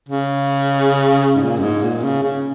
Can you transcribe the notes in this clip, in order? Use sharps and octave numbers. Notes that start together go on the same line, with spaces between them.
C#3
G#2
A#2
F#2
G#2
A#2
C#3
C#3